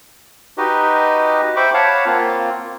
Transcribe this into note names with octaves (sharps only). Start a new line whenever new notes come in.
D#4 F#4 G4 B4 D#5
C5 E5 G5 B5 C#6 D6
C#5 F5 F#5 A5 B5
A#3 C4 F4